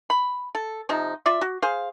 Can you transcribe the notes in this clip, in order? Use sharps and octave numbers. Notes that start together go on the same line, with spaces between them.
B5
A4
C3 F3 D#4
F4 D5 E5
F#4
G#4 C5 F5